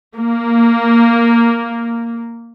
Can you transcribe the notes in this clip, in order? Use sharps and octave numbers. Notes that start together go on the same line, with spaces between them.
A#3